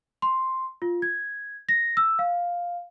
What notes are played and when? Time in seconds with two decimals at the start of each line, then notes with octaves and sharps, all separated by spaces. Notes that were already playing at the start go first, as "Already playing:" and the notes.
0.22 C6
0.82 F4
1.02 G#6
1.69 A#6
1.97 E6
2.19 F5